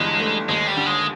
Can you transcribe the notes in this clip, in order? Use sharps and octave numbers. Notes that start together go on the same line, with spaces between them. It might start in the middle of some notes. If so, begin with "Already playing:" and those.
Already playing: G1 G2 E3 G#3
A3
D#2 G#3
G3
D3
G#3